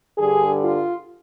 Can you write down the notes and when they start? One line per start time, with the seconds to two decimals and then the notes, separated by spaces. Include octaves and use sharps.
0.18 G2 D3 G3 G#4
0.62 F4